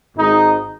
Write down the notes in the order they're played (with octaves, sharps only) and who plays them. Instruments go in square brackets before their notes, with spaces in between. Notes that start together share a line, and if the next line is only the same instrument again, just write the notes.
[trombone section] G#1 G#2 G#3 D#4